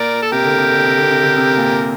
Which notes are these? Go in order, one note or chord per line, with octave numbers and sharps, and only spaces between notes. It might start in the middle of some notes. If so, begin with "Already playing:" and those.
Already playing: A#2 A#4 D5
A4
C3 G4 A#4
D3
C3
D3
C3
D3
C3
D3
C3
A#2